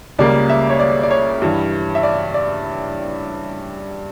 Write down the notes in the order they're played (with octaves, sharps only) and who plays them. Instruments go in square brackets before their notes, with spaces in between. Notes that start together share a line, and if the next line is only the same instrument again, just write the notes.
[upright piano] C#2 C#3 G3 A#3 D5
E5
C#5
D5
D5
C#5
G2 E3 G3
E5
D5
D5